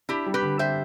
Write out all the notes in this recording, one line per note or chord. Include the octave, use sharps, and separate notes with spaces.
D4 E4 G4
G3
G4 B4
D3
G4 C5 E5